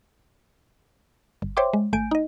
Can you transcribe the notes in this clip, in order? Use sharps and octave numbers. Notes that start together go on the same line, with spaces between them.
G1
C5 C#5 E5 G5 C6 D6
G#3
G#1 A3 G#5 G6 D7
D#4 D#5